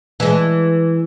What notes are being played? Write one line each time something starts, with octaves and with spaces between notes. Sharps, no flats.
E3 G#3